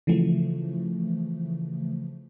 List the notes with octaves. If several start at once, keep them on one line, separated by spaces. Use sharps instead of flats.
C#3 E3 F3 A3